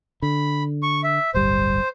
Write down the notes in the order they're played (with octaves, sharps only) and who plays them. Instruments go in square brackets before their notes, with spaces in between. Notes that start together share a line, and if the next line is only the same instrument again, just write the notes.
[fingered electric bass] D3 [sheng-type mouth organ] B5
[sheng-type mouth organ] C#6
E5
[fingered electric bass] D1 G1 G3 [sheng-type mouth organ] C5